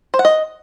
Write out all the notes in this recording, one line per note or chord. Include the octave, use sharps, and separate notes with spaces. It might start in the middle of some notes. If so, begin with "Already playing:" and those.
C5
F#5
D#5